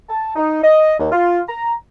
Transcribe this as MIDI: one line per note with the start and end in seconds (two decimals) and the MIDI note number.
0.09 0.32 81
0.36 0.62 63
0.63 0.95 75
0.98 1.08 39
1.12 1.40 65
1.48 1.73 82